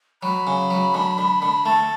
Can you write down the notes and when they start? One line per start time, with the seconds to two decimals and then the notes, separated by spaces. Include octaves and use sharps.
0.23 F#3 B5
0.47 C#3
0.70 F#3
0.94 D3
1.18 D3
1.42 D3
1.65 A3 A5